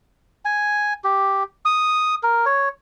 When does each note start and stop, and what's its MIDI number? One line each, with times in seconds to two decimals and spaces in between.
0.45 0.93 80
1.04 1.43 67
1.65 2.15 87
2.23 2.45 70
2.46 2.69 73